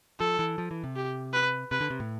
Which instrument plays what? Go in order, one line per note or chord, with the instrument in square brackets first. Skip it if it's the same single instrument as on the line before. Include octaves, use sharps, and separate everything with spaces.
[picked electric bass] F3 [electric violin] A4
[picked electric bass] E3
F3
E3
C3
[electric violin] G4
B4
[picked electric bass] C3 [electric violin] B4
[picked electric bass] D3
C3
A2